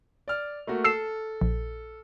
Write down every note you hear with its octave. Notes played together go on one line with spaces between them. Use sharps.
D5 F6
A3 A#3 F#4
A4 E6 C7 E7
A#1